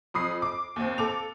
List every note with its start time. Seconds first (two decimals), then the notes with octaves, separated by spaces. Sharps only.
0.14 F2 B5 D#6 C7
0.42 D6
0.76 D#2 C4
0.98 A4 D6 F7